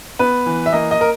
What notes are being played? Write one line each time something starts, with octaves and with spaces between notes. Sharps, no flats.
B3 B4
E3
E5
A#3 D#5
D#5
A#4